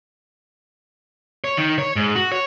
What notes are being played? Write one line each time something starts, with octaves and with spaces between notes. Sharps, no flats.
C#5
D#3
C#5
G#2
F#4
C#5